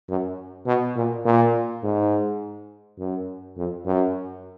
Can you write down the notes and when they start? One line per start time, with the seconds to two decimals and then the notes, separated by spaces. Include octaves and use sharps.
0.09 F#2
0.66 B2
0.96 A#2
1.25 A#2
1.83 G#2
2.99 F#2
3.57 F2
3.85 F#2